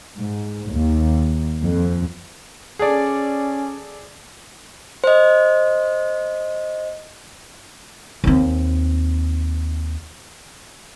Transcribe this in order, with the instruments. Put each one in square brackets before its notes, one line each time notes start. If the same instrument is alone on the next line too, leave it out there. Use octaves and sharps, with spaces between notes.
[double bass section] G#2
D#2
F2
[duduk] C#4 [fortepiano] G#4 A4 D5
[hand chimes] C5 D#5
[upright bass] D#2 C4